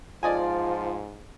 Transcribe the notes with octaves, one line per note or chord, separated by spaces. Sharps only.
G#2 F3 F4 D5 D#5 G#5